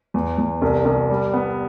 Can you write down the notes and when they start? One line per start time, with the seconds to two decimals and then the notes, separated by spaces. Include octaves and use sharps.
0.14 E2
0.38 E2
0.62 C2
0.85 C2
1.10 G3
1.34 B3